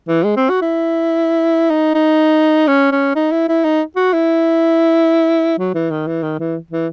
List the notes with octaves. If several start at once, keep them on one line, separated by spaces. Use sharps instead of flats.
E3
G#3
C4
F#4
E4
D#4
D#4
C#4
C#4
D#4
E4
E4
D#4
F#4
E4
F#3
E3
D#3
E3
D#3
E3
E3